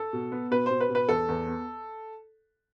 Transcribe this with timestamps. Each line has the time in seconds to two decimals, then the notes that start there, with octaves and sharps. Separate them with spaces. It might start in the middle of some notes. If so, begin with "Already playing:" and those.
Already playing: A4
0.13 B2
0.32 B3
0.51 B2 B4
0.66 B2 C5
0.81 B4
0.89 B2
0.95 B4
1.09 E2 A4
1.28 E2
1.47 B3